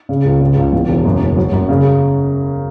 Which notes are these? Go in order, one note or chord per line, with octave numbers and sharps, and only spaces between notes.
C#3
C#2
C#3
C#2
E2
E1
F#2
F#1
F#3
F#2
C#3